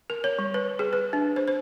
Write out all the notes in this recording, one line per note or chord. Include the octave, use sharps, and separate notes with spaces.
A#4
C#5
G3
B4
G#4
B4
D4
C5
C5